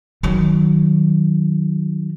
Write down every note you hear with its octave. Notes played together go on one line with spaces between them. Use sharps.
D#3 F#3